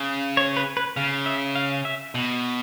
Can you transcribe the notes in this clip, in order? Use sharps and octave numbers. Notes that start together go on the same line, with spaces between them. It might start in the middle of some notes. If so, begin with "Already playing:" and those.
Already playing: C#3
C#5
B4
B4
C#3 F5
E5
F5
E5
B2